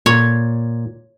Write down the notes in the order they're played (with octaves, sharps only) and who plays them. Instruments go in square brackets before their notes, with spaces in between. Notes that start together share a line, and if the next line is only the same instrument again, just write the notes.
[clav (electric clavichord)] A#2 [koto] C#5